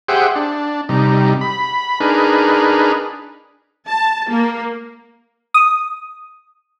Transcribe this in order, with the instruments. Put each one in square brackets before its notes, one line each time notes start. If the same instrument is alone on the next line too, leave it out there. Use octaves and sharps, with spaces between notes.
[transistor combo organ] G4 G#4 C5 E5 F#5 G5
D4
C3 G3 D#4
B5
D4 D#4 G#4 A#4 B4
[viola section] A5
A#3
[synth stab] D#6